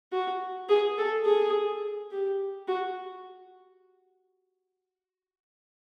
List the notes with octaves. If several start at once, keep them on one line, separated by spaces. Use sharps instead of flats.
F#4
G#4
A4
G#4
G4
F#4